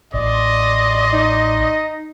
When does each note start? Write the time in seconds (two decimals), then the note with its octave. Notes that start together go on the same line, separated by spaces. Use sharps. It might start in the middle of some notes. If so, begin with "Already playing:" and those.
0.14 A1 D5 D#5 C6
1.13 D#4